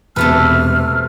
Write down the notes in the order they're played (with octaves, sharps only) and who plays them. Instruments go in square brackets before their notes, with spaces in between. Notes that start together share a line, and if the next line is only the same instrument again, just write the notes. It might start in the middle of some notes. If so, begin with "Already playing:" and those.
[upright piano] E1 [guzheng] C3 A3 B4 [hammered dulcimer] A4 [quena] F6